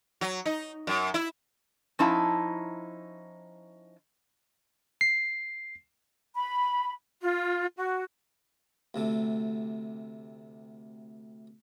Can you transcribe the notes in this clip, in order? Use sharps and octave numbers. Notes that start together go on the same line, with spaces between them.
F#3
D#4
F#2
E4
F3 C#4 D#4 E4 A5
C7
B5
F4
F#4
D2 C3 A3